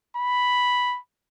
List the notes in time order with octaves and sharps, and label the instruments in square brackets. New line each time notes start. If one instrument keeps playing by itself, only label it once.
[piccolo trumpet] B5